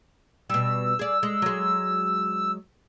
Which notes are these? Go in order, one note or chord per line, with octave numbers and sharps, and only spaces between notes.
B2 G3 E6
G#4 D5
G#3
F#3 G#3